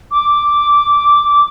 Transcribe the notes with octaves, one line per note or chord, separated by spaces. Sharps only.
D6